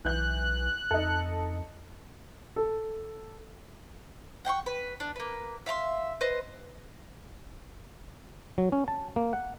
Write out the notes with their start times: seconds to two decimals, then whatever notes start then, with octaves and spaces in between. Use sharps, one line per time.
0.05 B1 E3 F#6 G6
0.91 F2 D#4 A4
2.56 A4
4.45 F#5 G5 C6 C#6
4.66 B4
5.00 D4
5.16 A#3 B4
5.66 E5 F5 A#5 C6
6.21 B4 C5 D#5
8.58 F#3
8.72 C#4
8.88 A5
9.16 A#3
9.33 F#5